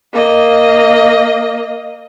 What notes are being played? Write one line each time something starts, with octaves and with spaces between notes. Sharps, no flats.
A#3 D#5